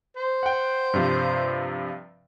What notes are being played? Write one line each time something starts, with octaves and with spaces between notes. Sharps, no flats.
C5
F#5 G5
G2 C3 F3